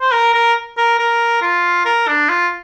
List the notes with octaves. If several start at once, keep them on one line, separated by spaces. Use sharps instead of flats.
C5
A#4
A#4
A#4
A#4
F4
A#4
D4
F4